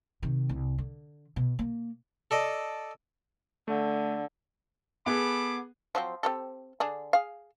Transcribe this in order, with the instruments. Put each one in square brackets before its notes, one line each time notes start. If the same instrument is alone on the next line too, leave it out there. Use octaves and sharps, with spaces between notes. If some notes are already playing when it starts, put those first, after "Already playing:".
[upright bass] C3 D#3
C2
D3
B2
A#3
[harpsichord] A4 D5 D#5
[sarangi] D3 [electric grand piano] A3
[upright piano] B3 G#4 [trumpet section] A4 B5 D6
[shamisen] F3 F#3 C4
C4 G4 A4
D3 D4 G#4
G#4 F5